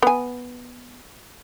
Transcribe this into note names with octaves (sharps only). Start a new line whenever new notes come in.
B3 G#5